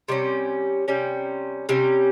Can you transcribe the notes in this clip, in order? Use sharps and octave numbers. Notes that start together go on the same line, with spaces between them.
C3 G3 C#4
C3 G3 C#4
C3 G3 C#4